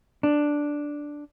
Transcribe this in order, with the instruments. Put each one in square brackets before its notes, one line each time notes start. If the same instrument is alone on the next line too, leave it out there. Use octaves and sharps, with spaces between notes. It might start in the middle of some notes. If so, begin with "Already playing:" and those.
[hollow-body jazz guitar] D4